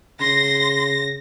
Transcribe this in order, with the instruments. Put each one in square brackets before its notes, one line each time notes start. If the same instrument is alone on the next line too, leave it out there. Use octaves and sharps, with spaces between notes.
[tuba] C#3 [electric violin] C6 [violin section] A#6